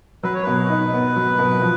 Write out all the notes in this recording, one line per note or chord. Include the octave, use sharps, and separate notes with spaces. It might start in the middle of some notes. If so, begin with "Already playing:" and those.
F#3 B4
C#5
B2 B4
D#4
B3
F#3
B2
F3